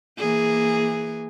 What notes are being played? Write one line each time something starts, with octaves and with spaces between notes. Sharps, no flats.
E3 A#3 G#4